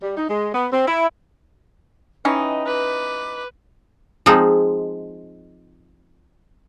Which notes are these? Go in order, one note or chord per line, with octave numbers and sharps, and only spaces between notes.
G3
D#4
G#3
B3
C4
E4
E3 C#4 D#4 B4 D#5 G5
B4 D6
F3 G#3 C4 D#4